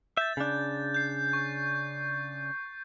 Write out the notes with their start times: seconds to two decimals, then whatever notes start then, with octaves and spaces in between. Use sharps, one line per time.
0.17 E5 G6 A6
0.37 C#3 D4
0.94 G6 C7
1.33 C#6